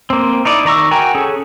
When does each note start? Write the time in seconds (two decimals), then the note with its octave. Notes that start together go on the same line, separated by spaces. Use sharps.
0.10 A#3 C4
0.45 D#4 E4 D5
0.65 D#3 D5 A#5 C#6 E6
0.91 F#4 A#4 G5 G#5 A#5
1.15 C#4 G#4 A4